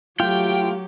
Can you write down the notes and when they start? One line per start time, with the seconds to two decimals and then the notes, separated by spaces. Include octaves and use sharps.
0.20 F#3 A3 F4 G4 G5